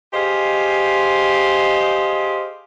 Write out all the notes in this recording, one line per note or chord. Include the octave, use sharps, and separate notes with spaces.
G4 G#4 C5 D#5 F5